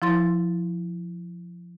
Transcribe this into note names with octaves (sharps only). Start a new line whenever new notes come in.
F3 E4 C6 A6